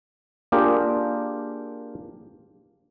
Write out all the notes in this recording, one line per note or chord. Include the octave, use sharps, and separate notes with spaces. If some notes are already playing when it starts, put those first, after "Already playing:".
A#3 D4 F4 G4 G#4 A#4